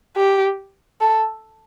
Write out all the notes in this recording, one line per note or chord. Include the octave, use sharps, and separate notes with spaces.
G4
A4